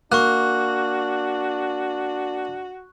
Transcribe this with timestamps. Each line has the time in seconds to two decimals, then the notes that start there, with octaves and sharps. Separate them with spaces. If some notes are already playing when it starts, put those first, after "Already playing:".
0.12 A#3 D4 F#4 C#6 F#6